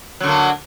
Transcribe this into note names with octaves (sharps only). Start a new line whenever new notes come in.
D3 F#3 A#3